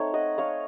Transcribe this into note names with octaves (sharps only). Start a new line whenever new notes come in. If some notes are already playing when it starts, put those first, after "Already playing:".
Already playing: A3 C4 D#4 C#5
D#5 F#5
C#5 F5